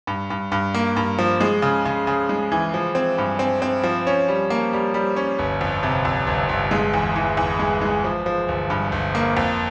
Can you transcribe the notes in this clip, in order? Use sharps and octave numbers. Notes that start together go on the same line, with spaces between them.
G2
G2
G2
A#3
G2
F3
G#3
C#3
C#3
C#3
G#3
E3
F3
C4
G2
C4
C4
F3
C#4
G3
A#3
G3
G3
C#4
G1
F2
C3
F2
G1
G1
G#3
E2
E3
E2
G#3
G#3
F3
F3
G1
G2
G1
A#3
F2